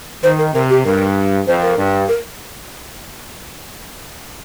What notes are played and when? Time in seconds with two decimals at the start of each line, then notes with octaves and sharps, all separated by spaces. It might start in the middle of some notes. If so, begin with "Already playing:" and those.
0.23 D#3 C5
0.39 A#4
0.54 C3 A#4
0.70 G4
0.85 G2 A#4
1.47 F2 C5
1.62 A#4
1.77 G2
2.08 A#4